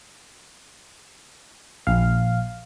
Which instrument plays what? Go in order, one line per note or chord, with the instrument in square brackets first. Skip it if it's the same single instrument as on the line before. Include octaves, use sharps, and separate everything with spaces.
[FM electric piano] A#1 F5